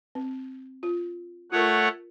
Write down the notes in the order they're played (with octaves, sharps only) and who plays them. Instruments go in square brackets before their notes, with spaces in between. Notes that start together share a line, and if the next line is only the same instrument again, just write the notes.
[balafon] C4
F4
[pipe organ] A3 C#5 F#5 [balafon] F4 A#4